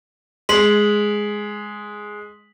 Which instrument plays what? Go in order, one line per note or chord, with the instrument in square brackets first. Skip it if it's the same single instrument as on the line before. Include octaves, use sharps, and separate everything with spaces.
[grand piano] G#3 [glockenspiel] C6 B6 F#7